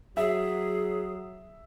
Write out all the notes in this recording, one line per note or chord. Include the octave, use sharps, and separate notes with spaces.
F#3 G#4 E5